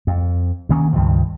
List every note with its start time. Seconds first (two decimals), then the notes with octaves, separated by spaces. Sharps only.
0.07 F2
0.69 D2 D#3 A#3 C#4
0.93 C#2 G2 D#3 F3